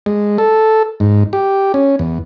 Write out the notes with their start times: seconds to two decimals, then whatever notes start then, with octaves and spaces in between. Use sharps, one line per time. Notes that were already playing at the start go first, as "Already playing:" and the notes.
0.06 G#3
0.38 A4
1.00 G#2
1.33 G4
1.74 C#4
1.99 E2